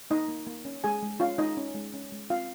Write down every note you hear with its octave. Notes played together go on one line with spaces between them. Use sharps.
A#3 D#4 D#5
A#3
A#3
C#4
G#3 G#4 G#5
G#3
C#4 F4 F5
G#3 D#4 D#5
C#4
G#3
C#4
G#3
C4 F4 F5